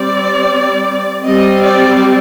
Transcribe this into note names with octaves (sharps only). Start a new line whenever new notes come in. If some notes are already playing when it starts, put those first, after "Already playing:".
Already playing: G3 C4 D5
G3 C4 D#5
D5